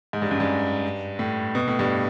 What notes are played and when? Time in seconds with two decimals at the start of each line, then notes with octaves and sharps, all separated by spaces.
0.13 G#2
0.22 G2
0.31 F#2
0.40 G2
1.19 A2
1.55 B2
1.67 A2
1.79 G2